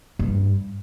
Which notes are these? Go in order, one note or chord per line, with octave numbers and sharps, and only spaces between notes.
G2